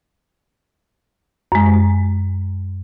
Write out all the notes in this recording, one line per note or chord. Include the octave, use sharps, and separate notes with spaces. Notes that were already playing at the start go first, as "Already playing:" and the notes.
F#2 G#3